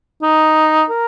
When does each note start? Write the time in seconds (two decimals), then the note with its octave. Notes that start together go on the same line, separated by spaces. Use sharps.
0.22 D#4
0.90 A#4